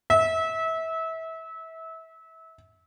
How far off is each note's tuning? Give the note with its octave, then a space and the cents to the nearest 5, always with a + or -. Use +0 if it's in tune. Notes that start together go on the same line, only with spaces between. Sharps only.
E5 -25